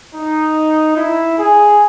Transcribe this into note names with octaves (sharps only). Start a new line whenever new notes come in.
D#4
E4
G#4